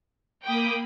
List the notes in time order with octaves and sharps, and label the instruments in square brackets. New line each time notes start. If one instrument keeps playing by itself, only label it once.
[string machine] A#3 B5 [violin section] G5 D6 D#6